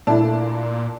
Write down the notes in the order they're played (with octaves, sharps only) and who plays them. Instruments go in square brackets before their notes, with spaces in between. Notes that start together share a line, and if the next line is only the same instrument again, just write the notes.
[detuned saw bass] A#2 [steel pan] A3 E4 [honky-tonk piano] D4 [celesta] A5